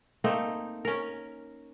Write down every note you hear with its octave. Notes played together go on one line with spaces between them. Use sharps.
A3 A#3 C4 D#4
C#4 A#4